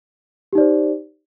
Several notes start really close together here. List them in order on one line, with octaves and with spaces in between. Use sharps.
G4 D#4 D5 C5